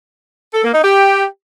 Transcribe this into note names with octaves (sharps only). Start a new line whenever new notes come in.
A4
A#3
D#4
G4